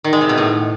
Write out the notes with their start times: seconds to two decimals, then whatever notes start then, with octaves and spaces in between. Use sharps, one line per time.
0.04 D#3
0.13 G#3
0.21 C3
0.29 B2
0.38 A2